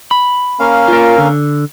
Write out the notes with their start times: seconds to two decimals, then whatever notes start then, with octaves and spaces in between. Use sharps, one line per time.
0.11 B5
0.60 A#3 C#4 F5
0.88 F4 A#4
1.18 D3